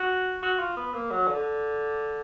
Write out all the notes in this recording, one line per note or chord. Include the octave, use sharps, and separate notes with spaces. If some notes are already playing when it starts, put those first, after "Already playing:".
Already playing: F#4
F#4
F4
B3
A#3
F#3
D3